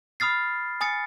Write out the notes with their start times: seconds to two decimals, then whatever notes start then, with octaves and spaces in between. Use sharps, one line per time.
0.20 B5 D#6 F6 A6 C7
0.81 G#5 D#6 A6 C#7